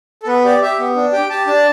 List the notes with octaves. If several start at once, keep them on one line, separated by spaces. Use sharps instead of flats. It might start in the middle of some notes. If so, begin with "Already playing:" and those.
A4
B3 B4
G4 D5
G4 E5
B3
D4
G4 G5
G4 A5
D4 A5